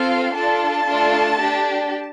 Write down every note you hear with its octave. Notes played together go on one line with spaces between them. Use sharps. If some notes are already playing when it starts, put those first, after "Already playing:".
Already playing: C4 F4 A4 F5
D4 F4 A4 A5
A3 D4 F4 A4
D4 G4